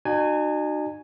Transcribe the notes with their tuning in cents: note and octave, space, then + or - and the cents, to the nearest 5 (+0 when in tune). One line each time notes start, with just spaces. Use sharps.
D#4 -45 F#4 +0 G#5 +0